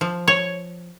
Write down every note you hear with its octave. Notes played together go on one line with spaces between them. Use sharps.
F3
C#5